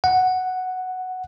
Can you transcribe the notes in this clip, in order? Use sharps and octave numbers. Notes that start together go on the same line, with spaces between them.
F#5